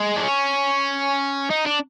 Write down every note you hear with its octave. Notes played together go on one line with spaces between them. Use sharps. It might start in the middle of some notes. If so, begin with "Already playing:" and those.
Already playing: G#3
D4
C#4
D#4
D4